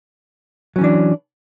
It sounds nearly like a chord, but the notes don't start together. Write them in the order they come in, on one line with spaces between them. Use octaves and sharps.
F#3 C#4 E3 D4